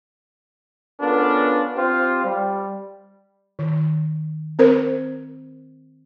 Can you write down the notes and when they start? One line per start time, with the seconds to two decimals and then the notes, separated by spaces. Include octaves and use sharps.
1.01 B3 C#4 D4 F4 A4 A#4
1.76 C4 F4 G4 C5
2.24 G3
3.59 D#3
4.59 C4 A#4 C5